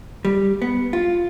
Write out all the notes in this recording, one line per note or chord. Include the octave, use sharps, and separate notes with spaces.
G3
B3
F4